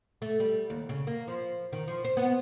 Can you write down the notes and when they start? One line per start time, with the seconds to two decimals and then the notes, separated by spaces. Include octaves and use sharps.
0.22 A3
0.40 G3
0.70 D#2
0.89 C#3
1.07 A#3
1.28 F3
1.72 D#3
1.87 F3
2.04 C5
2.17 B3